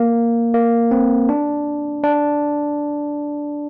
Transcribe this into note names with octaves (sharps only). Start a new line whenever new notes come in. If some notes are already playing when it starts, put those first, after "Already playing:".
Already playing: A#3
A#3
C4
D4
D4